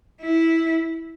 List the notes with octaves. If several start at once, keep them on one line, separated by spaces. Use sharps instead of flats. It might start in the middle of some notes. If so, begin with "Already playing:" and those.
E4